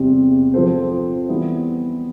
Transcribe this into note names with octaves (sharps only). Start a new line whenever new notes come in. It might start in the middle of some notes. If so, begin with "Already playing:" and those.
Already playing: E2 C3 G3 C4 G4
F3 C4 F4 A4 C5
E3 G3 B3 E4